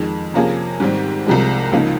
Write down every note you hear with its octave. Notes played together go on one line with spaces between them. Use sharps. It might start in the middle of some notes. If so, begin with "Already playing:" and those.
Already playing: F2 D#3 G#3
C3 F3 A#3 C#4 G#4
G#2 D#3 G3 C4 G4
C2 C3 F3 G#3
C#2 C#3 F3 A#3 D#4